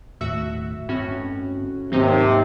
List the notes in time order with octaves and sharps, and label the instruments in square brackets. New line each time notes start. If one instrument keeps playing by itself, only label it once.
[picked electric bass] D#2 A2 [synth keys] F#4 E5 E6
[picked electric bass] G1 C4 [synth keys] A2 C#4 F#4
[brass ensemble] D#2 C3 [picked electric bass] G#2 F#3 [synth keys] C4 D#4 C5